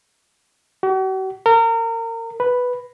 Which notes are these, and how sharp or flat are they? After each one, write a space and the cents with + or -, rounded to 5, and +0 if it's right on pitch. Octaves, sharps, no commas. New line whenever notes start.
F#4 +45
A#4 -30
B4 +0